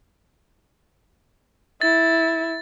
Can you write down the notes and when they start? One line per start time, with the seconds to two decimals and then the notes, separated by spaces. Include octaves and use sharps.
1.81 E4 A6